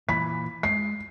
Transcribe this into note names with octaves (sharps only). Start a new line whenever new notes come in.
A#2 E3 B5 B6
G#3 C7